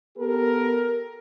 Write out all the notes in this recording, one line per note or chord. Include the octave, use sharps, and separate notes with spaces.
B3 G4 A4 A#4